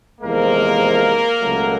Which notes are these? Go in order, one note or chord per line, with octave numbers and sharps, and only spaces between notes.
E2 C3 F3 G#3 A#3 A#4
C#2 B2 F#3 A3